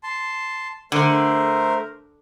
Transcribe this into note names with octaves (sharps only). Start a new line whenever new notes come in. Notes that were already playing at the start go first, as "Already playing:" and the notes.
A5 C6
D3 A3 A#4 C5